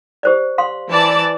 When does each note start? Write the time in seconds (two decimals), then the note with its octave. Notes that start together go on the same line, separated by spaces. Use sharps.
0.23 G4 C5 D5
0.58 F5 C6
0.89 E3 D5 A5